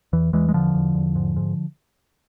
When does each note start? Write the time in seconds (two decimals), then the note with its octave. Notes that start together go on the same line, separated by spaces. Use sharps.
0.13 E2 E3
0.33 E2 E3 G#3
0.49 G#3
0.53 E2 D3 F3
0.75 E2
0.95 E2
1.16 G#2
1.36 G#2